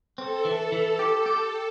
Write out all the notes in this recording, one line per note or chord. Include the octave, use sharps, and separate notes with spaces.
C4 A4
E3
E3
G4
G4